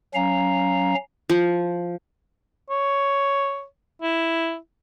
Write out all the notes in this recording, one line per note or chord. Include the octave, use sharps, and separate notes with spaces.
F#3 C#4 F5 A#5
F3
C#5
E4